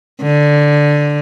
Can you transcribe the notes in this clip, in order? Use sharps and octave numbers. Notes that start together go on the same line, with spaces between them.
D3